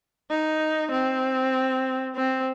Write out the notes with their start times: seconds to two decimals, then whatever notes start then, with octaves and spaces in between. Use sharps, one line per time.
0.31 D#4
0.91 C4
2.16 C4